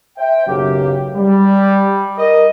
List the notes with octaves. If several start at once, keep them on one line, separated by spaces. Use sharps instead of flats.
C5 E5 G5
F#1 B1 C#3 F#3 A#3 G4
G3
A#4 D#5